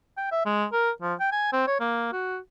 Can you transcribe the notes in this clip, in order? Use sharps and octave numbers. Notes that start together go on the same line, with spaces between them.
G5
E5
G#3
A#4
F3
G5
G#5
C4
C#5
A#3
F#4